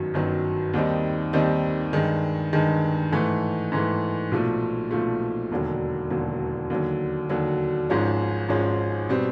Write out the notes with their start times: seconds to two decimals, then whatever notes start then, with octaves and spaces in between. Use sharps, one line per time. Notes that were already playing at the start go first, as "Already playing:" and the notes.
Already playing: G1 F#2 D#3 F#3
0.14 G1 F#2 D#3 F#3
0.74 D#2 D#3 G3 C4 D#4
1.33 D#2 D#3 G3 C4 D#4
1.93 G2 D#3 G#3
2.53 G2 D#3 G#3
3.12 G#2 E3 A3
3.72 G#2 E3 A3
4.31 B1 A#2 F3 A3
4.91 B1 A#2 F3 A3
5.51 E1 D#2 D3 F#3
6.10 E1 D#2 D3 F#3
6.70 D#2 D3 F#3
7.29 D#2 D3 F#3
7.90 G#1 G#2 F3 G#3 C#4
8.49 G#1 G#2 F3 G#3 C#4
9.09 B2 G3 C4